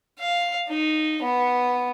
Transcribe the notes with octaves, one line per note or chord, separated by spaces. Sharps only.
F5
D#4
B3